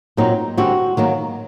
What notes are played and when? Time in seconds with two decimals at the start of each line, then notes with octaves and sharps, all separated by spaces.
0.17 A#2 F#3 C4 D#4
0.57 D3 G3 C4 F#4
0.97 D#3 F#3 A#3